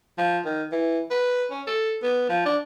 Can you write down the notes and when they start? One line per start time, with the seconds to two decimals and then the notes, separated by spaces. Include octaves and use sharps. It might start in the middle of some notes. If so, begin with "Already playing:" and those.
0.18 F3
0.45 D#3
0.72 E3
1.11 B4
1.50 C#4
1.67 A4
2.03 B3
2.29 F3
2.45 D4